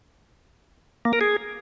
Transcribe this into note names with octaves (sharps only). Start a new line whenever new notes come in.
A#3
A#4
G#4